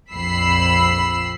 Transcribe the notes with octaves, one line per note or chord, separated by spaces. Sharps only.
A#1 F2 B5 E6 C7